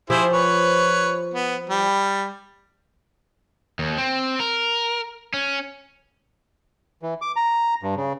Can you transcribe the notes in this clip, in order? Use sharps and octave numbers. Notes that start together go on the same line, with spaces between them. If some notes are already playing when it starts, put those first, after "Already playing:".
F3 E4 G4 G#4 C5
B4 C#5
B3
G3
D#2
C4
A#4
C#4
E3
D6
A#5
G2
C#3